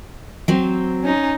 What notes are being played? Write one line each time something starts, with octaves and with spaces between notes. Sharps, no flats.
F#3 C4
C#4 D#4